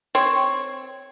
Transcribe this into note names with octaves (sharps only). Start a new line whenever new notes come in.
C4 C#5